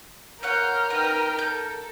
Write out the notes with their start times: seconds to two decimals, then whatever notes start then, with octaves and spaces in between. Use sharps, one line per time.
0.43 A#4 C#5 F5 F#5 F6 G6
0.90 D#4 B4 G5
1.39 A4 G6